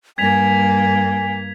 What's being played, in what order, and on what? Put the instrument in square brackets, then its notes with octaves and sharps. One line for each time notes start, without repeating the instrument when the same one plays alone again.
[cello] G2 A#3 [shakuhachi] G#5 [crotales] G#6 B6 F7